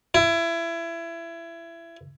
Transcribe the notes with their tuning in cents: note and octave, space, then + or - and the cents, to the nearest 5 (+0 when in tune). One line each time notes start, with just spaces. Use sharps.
E4 +25